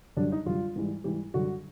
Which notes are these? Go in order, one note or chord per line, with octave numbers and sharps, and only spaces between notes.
F#2 D3 G3 D4
D#4
F#2 D3 G3 F4
G#2 E3 G3
G#2 E3 G3 G4
F#2 D3 G3 F#4